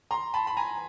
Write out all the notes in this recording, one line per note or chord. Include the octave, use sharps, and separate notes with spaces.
A#5 C6
A5 B5
B5
G#5 A#5